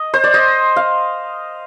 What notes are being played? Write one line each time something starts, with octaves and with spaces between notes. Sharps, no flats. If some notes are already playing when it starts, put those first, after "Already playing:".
Already playing: D#5
C5
D5
D#5
F5